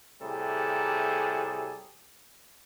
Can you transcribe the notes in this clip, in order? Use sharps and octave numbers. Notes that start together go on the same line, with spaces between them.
A2 C3 G3 G#4 A4